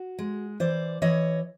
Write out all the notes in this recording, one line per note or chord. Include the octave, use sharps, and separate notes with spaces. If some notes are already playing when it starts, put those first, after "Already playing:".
Already playing: F#4
G#3
E3 C5 D5
E3 C#5 D#5